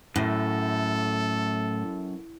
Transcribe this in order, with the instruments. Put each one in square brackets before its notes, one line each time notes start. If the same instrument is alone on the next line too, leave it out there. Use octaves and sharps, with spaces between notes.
[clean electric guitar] F#2 [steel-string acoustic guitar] A2 [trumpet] A4